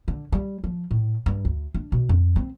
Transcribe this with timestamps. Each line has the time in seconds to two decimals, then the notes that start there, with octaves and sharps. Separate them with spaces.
0.08 D3
0.32 G3
0.64 F3
0.91 A2
1.26 G2
1.45 D2
1.74 D4
1.92 B2
2.09 F2
2.36 C4